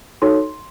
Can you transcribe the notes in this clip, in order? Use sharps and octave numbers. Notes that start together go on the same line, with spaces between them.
D#4 F#4 A4 C#5 C6